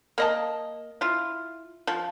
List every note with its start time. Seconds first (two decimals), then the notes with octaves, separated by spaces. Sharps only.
0.18 A#3 D#5 A5
1.01 E4 F4
1.87 F3